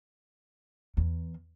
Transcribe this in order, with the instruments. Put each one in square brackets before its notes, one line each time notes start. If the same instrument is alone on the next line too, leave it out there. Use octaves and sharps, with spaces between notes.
[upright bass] E2